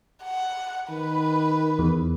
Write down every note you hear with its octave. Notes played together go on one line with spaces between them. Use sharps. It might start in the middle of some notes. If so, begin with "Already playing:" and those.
F#5
D#3 B4
E2